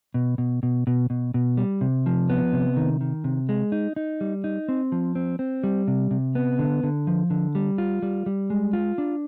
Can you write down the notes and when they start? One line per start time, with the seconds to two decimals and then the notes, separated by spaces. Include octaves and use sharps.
0.14 B2
0.38 B2
0.63 B2
0.87 B2
1.10 B2
1.34 B2
1.57 G3
1.81 C3
2.06 F3
2.30 B3
2.53 C3
2.77 D#3
3.01 D#3
3.24 C3
3.49 G#3
3.72 D#4
3.96 D#4
4.21 G3
4.44 D#4
4.69 C4
4.92 F3
5.15 C4
5.39 C4
5.64 G3
5.88 C3
6.11 C3
6.35 B3
6.59 D3
6.83 D3
7.07 F3
7.30 D3
7.55 G3
7.78 F4
8.02 G3
8.26 G3
8.50 G#3
8.73 F4
8.98 D4